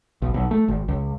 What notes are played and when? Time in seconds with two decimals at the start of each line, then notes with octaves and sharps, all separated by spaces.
0.22 B1
0.34 B1
0.51 A3
0.68 G#1
0.88 C#2